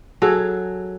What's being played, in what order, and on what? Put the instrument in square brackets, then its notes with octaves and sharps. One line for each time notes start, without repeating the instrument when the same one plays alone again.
[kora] F#3 G#4 A4